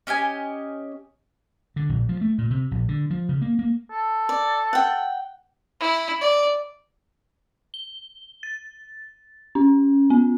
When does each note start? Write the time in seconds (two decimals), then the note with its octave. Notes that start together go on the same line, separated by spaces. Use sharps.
0.07 C#4 G4 D#5 G#5
1.76 D3
1.89 A#1
2.09 F3
2.21 A3
2.38 A#2
2.50 C3
2.71 A#1
2.88 D3
3.10 F3
3.29 C#3
3.41 A#3
3.59 A#3
3.91 A4
4.29 D5
4.73 F#5 G5
5.80 E4
6.21 D5
7.74 G7
8.43 A6
9.55 C#4
10.10 B3